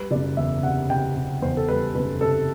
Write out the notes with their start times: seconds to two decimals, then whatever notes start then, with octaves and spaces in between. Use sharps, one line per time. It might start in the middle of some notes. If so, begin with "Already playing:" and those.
Already playing: G3 B4
0.11 F#1 D5
0.37 E2 E5
0.63 C3 F#5
0.90 C3 G5
1.15 C3
1.42 E2 C5
1.57 A4
1.68 G3 B4
1.95 F#1 B4
2.21 C3 A4